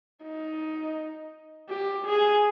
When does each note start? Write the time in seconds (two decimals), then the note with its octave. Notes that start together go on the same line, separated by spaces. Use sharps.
0.24 D#4
1.69 G4
2.06 G#4